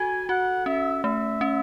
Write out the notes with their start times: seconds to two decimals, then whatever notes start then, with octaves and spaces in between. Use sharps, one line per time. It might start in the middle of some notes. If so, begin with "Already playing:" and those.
Already playing: F#4 A4 G#5
0.29 F#4 F#5
0.66 C#4 E5
1.04 A3 E5
1.41 C#4